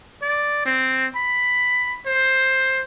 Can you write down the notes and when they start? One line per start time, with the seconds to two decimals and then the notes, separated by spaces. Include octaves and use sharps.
0.22 D5
0.66 C4
1.16 B5
2.06 C5